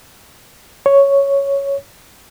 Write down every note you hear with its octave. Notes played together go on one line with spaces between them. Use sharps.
C#5